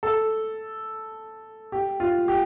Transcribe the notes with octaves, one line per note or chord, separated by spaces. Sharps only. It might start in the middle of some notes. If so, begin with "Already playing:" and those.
A4
G4
F4
G4